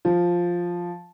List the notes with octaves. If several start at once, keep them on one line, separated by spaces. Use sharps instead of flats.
F3